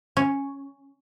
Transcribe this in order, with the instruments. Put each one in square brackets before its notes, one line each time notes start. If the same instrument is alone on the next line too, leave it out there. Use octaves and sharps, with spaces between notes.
[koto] C#4